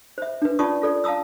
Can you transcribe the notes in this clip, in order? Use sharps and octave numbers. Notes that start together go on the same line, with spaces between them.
C5 E5
D4 B4
C#4 F4 D5 A5 C#6 D#6
F4 A4 D5
F5 A5 A#5 D#6 E6